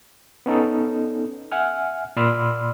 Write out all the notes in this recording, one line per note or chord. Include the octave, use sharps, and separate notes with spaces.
B3 C#4 D#4 A4
E5 F#5 G#5 F6
A#2 D5 B5 C6 E6 F6